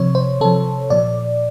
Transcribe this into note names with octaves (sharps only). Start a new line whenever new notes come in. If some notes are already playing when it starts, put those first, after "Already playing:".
Already playing: C3 F3 C#5
C5
C3 F3 A4
A#2 F3 D5